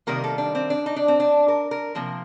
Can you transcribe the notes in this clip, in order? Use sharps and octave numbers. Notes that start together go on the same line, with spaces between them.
C3 D#3 G3 A#3 A#4
A4
D4
C4
D4
D#4
D4
C4
D4
A#4
A#4
C3 F3 A#3